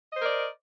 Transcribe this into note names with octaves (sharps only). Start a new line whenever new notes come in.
A#4 C5 D5 D#5